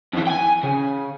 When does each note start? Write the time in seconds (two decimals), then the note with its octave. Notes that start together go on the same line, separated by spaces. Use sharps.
0.13 F2 E3
0.27 G5 G#5
0.63 C#3